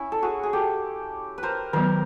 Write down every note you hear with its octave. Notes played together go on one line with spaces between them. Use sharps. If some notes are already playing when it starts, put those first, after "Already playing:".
Already playing: C#4 E4
A4
F#4 G#4
G#4
G4 A4
B4
A#4 C5
D#3 F#3 B3 A#4 C5